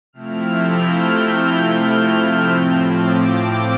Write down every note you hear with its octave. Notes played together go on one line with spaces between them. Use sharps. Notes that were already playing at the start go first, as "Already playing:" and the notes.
C3 F3 A3 C4 E4 F6
G6
F6
A2 F3 C4
D6